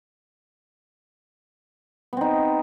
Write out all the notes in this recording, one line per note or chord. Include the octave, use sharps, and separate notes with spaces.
B3 C4 D#4